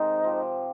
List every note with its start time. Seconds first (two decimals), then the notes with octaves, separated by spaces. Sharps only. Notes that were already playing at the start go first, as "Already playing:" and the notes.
Already playing: C3 D#3 G#3 D#4
0.24 F3 C4 G4